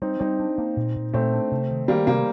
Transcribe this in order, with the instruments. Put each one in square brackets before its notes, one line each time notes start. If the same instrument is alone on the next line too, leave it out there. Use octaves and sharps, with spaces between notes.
[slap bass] G3 [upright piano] C4 D#4
[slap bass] G3 [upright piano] C4 D#4
[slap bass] D4
A#3
A#2
A#2
[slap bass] A#2 [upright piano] A3 C4
[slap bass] D4
C3
D#3
[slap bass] D#3 [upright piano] G3 A#3
[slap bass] C3 [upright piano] G3 A#3